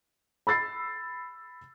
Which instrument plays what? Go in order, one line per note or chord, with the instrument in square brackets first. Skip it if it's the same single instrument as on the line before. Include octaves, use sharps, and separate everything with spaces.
[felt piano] B5 E6 A6 C7